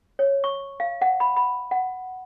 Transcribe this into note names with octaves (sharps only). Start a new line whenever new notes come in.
C#5
C#6
F5
F#5
B5
B5
F#5